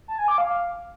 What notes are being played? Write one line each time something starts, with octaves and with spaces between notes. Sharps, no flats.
A5
G#5
D6
F5